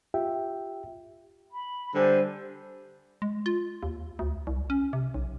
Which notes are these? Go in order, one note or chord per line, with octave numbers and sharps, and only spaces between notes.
F4 G4 E5 G5
B5
D3 G3 C5 G#5
G#3
F4
D#2
D2
C2
C#4
C3
B1